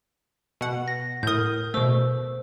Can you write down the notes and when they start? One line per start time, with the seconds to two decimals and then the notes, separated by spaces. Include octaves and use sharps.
0.61 B2 F#5
0.88 A#6
1.23 A2 A#4 D#6 G6
1.74 B2 A3 C5 E6